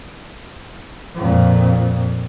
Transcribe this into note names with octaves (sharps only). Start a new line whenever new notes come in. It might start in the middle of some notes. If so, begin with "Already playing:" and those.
F2 A#2